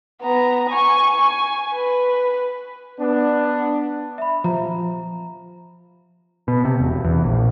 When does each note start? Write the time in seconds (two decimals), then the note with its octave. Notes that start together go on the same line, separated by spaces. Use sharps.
0.22 B3 A#5
0.70 G#5 C#6
1.21 G#5
1.74 B4
2.99 B3 D4
4.18 E5 B5
4.44 F3 A#5
6.48 B2
6.65 C3
6.80 E1
7.04 E2
7.24 A#1